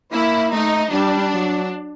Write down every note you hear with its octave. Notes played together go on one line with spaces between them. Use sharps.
A#3 E4
A3 D#4
G3 D4
F#3